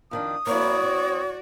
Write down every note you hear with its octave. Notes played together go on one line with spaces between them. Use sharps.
F2 D#3 D4 D#6
A#3 C4 E4 F#4 C#5 D5
C4